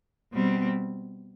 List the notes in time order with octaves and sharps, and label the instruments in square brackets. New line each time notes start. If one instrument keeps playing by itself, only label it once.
[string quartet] B2 G3 C4